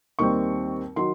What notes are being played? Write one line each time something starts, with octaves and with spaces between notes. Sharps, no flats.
D#2 D#3 G3 C4 C#6
D#3 F#3 C6